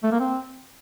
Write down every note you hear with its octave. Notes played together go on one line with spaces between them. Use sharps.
A3
A#3
C4